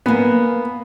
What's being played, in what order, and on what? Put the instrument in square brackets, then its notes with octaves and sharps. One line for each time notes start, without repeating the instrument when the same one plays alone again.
[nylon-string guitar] A#3 G#5 [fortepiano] B3